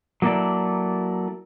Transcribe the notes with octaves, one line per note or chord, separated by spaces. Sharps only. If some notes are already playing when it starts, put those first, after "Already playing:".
F#3 A#3 E4 A4 D5